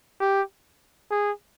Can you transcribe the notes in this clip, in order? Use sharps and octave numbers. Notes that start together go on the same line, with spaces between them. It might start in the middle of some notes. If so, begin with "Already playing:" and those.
G4
G#4